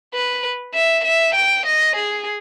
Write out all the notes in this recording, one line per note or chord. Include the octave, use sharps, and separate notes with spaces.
B4
E5
E5
G5
D#5
G#4